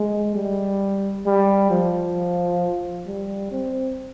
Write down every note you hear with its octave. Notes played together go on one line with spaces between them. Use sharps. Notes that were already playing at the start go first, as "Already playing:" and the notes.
Already playing: G#3
G3
G3
F3
G3
C4